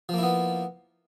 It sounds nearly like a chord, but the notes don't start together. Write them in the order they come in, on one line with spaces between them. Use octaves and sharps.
F3 A#3 E4 B3